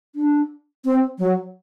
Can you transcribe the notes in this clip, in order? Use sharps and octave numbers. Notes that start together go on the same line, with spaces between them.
D4
C4
F#3